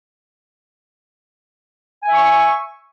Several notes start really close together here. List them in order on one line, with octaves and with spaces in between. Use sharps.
G#5 E5 C#6